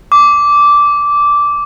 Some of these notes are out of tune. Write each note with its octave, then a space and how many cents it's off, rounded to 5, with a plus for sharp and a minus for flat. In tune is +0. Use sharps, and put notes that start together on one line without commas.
D6 -10